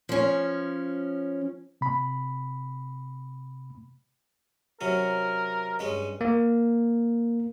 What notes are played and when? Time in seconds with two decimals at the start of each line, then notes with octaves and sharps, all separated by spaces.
0.09 F3 C#4
1.81 C3 B5
4.81 C3 F#3 C#4 A#4
5.79 G2 G#3 C#4
6.21 A#3